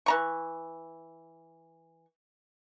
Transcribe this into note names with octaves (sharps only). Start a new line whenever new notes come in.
E3 A#5 C#6